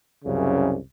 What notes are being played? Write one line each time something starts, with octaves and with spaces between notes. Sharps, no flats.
C2 F#2 C#3